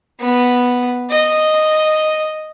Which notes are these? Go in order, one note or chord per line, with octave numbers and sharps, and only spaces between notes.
B3
D#5